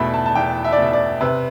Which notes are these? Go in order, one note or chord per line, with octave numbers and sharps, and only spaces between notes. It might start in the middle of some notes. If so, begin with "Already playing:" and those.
Already playing: E2 B2 A3 B5
A5
A5
E2 G5
E5
D5
B2 A3 E5
D5
C3 B4